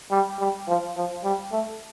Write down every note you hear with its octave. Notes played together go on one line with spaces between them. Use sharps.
G3
G3
F3
F3
G3
A3